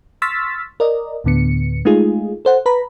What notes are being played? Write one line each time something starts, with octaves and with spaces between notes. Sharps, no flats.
C6 C#6 E6 F6 A6 B6
A#4 D5 D#5
D2 A2 D3 B3 C#7
G#3 A3 D#4 F4 G#4
A4 C5 F#5
B4 A#5 B5